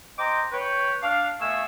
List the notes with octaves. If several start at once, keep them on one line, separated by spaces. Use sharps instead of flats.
C5 D#5 G5 A#5 D6
B4 C#5 G5
D4 F5
B2 A3 E5 F5 G#5 E6